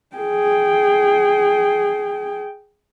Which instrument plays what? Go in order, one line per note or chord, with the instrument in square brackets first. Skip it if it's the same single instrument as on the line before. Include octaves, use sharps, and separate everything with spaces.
[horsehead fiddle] G#4 G5